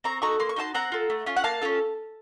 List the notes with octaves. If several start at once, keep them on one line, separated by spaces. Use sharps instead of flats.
C4 A#5 C#6
D#4 F#4 A4 A#5 C#6
A#3 C6
C#6
D#4 F#4 A4 A5 C6
C4 F#5 A#5
F4 A4
A3
C#4 F4
F#5
A#3 F5 A5
C#4 F4 A4